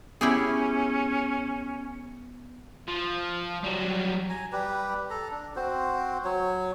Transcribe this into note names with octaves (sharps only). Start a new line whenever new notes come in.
B3 C#4 E4 G4 G#4
F3
F#3 G3
G#5 A#5
G3 G4 B4
A4 A#5
D4
C4 F#4 C5
F#3 C#5